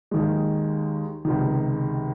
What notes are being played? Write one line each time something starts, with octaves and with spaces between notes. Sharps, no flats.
D#2 D#3 G#3
C#2 C3 D#3